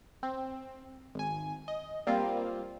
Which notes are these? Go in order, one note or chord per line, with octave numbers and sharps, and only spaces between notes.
C4
G#1 G#5
D#5
G3 A#3 C4 F4